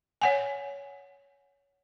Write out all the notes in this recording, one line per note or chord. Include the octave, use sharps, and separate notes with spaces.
C#5 F#5 G#5